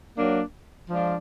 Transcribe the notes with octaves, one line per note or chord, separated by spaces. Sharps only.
F#3 A#3 D4
F3 G#3 D4 F4